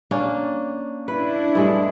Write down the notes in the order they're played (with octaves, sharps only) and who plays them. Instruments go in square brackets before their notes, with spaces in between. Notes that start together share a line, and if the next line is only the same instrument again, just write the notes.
[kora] A#3 C#4 D4
[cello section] D4 E4 [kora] B4
[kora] G2 G#3 A3